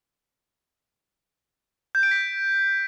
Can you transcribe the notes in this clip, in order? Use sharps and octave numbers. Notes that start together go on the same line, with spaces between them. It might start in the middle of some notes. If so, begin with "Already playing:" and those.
G6
D7
B6